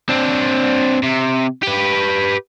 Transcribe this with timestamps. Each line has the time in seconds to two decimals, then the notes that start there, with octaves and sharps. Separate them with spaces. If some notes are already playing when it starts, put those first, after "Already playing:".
0.09 C4 D4
1.03 C3
1.63 G4 B4